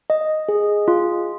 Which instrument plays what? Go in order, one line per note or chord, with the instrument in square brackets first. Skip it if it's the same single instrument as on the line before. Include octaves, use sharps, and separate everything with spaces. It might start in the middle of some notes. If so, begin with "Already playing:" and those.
[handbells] D#5
G#4
F4